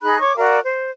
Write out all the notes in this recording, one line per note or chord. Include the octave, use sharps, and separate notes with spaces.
D#4 G#4 B5 F#6
C#5 C#6 D6
F#4 A#4 D5 F5
C5